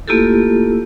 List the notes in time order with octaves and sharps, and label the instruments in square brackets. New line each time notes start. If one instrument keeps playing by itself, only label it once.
[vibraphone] A3 A#3 E4 F4 G4 A4